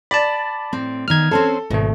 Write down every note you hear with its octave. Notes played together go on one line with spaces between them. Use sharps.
D5 A5 B5
A2 C4
D#3 B3 F6 G#6
C4 C#4 A4 C5
G#1 B2 A3